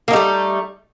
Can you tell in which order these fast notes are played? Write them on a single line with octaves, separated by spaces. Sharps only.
A#3 D#4 G3 A3